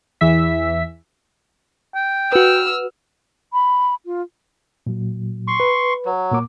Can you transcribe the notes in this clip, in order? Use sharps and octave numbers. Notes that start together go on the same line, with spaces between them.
E2 E3 E5 B6
G5
F#4 B4 E6 F6
B5
F4
A#2 F#3
C6 C#6
B4
F#3
A#2 A#3 D6